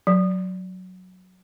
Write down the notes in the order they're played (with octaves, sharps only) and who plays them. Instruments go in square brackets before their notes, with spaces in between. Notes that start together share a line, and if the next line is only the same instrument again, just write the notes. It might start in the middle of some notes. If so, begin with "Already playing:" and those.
[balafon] F#3